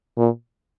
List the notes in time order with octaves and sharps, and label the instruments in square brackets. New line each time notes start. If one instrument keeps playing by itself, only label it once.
[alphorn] A#2